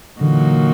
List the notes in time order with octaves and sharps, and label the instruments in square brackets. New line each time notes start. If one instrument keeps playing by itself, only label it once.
[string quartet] A#2 F#3 A#3 D#4 F#4 [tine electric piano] D3 E3